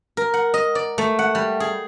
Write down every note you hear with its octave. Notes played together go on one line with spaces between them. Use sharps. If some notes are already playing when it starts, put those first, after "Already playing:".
A#4
F#5
D#5
D5
A3
F#5
G3
G#4